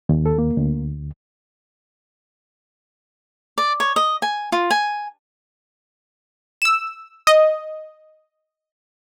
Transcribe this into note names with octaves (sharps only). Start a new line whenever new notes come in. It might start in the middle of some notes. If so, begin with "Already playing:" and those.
D#2
A4
A#3
D2
D5
C#5
D#5
G#5
F4
G#5
E6 E7
D#5